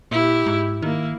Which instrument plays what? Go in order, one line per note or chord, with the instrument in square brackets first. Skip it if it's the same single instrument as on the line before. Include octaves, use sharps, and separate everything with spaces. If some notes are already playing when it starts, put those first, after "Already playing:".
[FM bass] A#2 [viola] E4 G4
[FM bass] G#2
[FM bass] D#3 [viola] A#3 E4